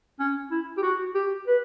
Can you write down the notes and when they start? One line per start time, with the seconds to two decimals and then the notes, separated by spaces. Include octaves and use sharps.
0.20 C#4
0.51 E4
0.77 G4
0.83 F#4
1.15 G4
1.47 B4